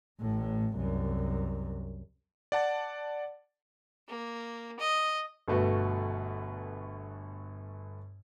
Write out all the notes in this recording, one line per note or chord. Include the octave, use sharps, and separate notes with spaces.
A1 A2
C2 F#2
D5 F#5 A5 A6
A#3
D#5
G1 B2 A3 F#4 B4